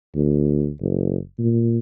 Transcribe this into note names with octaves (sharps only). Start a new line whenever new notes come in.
D2
F#1
A#2